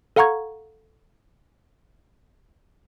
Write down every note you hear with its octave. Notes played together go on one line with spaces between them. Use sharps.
A4 F5 F#5 A#5 C#6 G#6